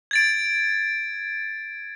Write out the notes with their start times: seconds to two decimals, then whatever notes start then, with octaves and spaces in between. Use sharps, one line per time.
0.11 G#6 A6 D7